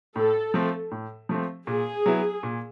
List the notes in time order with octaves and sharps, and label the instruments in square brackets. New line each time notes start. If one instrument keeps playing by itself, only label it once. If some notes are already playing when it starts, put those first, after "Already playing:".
[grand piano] A2 [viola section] A4
[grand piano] F3 A3 C4
A2
F3 A3 C4
[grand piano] A#2 [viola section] G#4
[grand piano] F#3 B3 E4
A#2